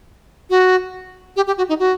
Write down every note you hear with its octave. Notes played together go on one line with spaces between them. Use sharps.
F#4
G4
G4
F#4
D#4
F#4